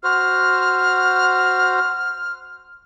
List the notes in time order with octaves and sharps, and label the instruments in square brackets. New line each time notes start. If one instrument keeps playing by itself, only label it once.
[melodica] F#4 C5 [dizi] F6